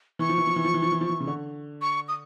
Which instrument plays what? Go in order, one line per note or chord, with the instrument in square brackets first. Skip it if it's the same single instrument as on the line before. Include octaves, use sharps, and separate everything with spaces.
[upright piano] E3 [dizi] C#6
[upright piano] F3
E3
F3
E3
F3
E3
F3
E3
F3
E3
C#3
D3
[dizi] C#6
D#6